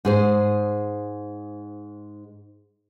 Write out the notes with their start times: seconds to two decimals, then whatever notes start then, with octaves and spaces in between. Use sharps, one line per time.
0.05 G#2 G#4 C5